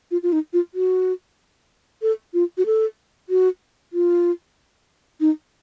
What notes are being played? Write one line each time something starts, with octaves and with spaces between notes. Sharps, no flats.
F4
F4
D#4
F4
F#4
A4
F4
F#4
A4
F#4
F4
D#4